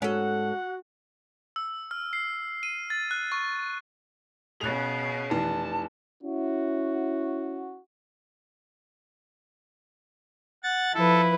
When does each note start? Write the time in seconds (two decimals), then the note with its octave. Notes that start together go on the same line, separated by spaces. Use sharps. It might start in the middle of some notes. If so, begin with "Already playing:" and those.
0.02 G#2 C#4 F#4 A4 F#5
1.56 E6
1.91 F6
2.13 C7
2.63 D#7
2.90 A6
3.11 F#6
3.32 C#6
4.61 B2 C#4 G#4 C#5 F#6 F7
5.31 F1 E3 A5
6.23 C#4 E4 F#4
10.63 F#5 A6
10.94 F3 E4 A4 B4